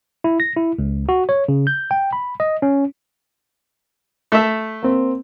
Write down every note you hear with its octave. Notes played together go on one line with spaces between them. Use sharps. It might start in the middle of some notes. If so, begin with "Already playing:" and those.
E4
A#6
E4
C#2
F#4
C#5
C#3
G6
G5
B5
D#5
C#4
A3 E5
A#3 C4